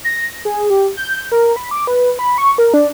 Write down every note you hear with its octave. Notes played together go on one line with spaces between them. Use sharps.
A#6
G#4
G4
G6
A#4
B5
D6
B4
B5
C#6
A#4
D4